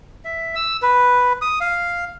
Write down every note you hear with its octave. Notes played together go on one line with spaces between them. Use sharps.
E5
E6
B4
D#6
F5